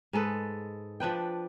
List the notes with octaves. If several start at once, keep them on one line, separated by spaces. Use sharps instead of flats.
G#2 G#3 A4 B4
F3 D4 B4 G5